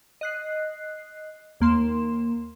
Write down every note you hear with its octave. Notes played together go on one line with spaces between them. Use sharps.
D#5 F#6 C7
D#2 A#3 C6 E7